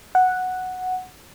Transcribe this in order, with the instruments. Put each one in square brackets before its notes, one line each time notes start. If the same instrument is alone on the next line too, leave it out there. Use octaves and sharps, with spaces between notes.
[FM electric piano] F#5